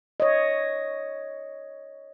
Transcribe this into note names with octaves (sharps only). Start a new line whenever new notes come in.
C#5 D#5